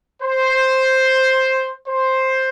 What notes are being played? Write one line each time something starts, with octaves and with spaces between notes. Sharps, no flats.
C5
C5